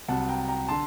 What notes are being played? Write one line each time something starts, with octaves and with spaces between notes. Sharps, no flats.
C2 C3 F#3 F#5 A5
G5 A#5
G5 A#5
D3 A5 C6